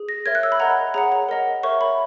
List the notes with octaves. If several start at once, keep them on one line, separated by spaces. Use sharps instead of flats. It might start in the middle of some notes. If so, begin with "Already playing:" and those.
Already playing: G#4
A#6
A#4 C#5 E5 G#6
F#6
E6
B5
A#4 D#5 F#5 A#5
G#4 C#5 F#5 A#5
A#5
A#4 D#5 F#5
A#4 C#5 E5 C#6
B5